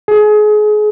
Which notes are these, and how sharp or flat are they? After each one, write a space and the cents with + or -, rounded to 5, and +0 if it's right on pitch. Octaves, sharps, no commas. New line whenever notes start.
G#4 +30